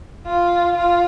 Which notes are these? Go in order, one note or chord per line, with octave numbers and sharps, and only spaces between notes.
F4
F4